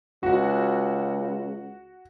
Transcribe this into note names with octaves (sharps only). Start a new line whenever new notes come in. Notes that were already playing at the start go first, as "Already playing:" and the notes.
C#2 F#4 F#5